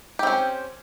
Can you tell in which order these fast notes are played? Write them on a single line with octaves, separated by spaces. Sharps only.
G4 C4 C#4